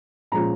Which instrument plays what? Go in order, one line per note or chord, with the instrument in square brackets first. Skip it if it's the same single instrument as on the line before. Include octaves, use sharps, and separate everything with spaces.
[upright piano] A#2 F3 G#3 C#4 F4 A#5